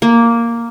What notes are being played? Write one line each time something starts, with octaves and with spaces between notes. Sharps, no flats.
A#3